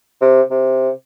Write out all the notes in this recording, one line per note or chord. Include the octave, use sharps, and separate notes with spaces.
C3
C3